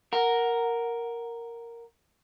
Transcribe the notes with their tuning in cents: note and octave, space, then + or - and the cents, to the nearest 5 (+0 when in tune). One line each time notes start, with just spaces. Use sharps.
A#4 +0 F#5 +0